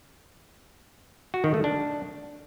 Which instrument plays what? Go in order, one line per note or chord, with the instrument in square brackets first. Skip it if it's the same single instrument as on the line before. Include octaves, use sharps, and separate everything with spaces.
[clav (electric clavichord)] F#4
D#3
A3
D4